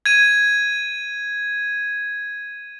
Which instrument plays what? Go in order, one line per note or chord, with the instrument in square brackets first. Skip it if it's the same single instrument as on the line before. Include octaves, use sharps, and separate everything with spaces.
[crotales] G#6 D#7